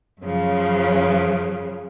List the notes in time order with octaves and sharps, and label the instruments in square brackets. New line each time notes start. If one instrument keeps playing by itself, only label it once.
[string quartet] F#2 C#3 F3